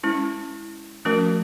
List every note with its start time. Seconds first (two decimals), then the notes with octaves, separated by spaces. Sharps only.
0.04 G#3 C#4 E4
1.05 F3 A3 C#4 F#4 A#4